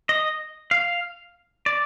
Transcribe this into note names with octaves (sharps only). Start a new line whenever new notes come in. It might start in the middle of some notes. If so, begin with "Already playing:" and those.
D#5
F5
D5